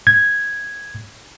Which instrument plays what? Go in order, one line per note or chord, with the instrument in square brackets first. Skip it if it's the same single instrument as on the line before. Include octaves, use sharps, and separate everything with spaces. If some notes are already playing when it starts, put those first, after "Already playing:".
[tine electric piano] G#6